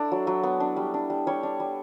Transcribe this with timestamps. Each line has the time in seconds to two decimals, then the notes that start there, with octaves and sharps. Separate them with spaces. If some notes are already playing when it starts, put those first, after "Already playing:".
Already playing: D4 E4 A4
0.12 F#3
0.27 F#3
0.43 B3
0.60 D4
0.76 G3
0.94 D4
1.10 G3
1.27 G3 C#5
1.43 D4
1.60 G3